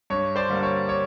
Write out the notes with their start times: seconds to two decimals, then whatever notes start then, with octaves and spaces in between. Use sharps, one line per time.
0.10 G2 C#5
0.36 C5 D5
0.49 D3 G3 A#3 D4
0.63 C#5
0.89 C#5